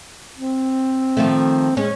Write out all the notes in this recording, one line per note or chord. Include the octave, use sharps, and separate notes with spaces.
C4
D#3 F3 A3
G#3 C#4